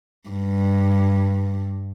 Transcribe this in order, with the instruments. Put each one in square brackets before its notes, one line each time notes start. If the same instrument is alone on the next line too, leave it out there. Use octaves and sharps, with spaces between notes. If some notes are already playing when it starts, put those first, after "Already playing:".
[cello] G2